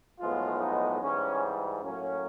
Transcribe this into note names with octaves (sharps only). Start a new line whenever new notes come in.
B1 A2 F3 G#3 B3 F4
D#4
G#2 E3 G3 C#4
A2 F#3 A#3 C#4